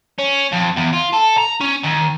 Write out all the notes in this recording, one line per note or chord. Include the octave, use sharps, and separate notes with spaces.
C#4
F2
E2
F4
A4
A#5
C#4
D#2